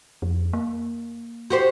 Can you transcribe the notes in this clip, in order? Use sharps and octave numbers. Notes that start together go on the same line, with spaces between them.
F2
A#3
F#4 G4 C5